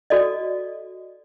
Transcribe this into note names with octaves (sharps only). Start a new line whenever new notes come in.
F#4 A4 D5 D#5